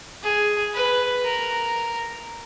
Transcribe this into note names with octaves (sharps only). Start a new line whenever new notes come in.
G#4
B4
A#4